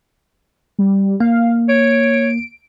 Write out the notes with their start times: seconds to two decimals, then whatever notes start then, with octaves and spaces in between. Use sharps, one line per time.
0.79 G3
1.20 A#3 F5
1.69 C#5 D7